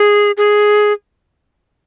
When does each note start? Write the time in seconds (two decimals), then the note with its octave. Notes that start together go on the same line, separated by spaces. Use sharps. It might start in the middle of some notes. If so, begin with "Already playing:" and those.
Already playing: G#4
0.37 G#4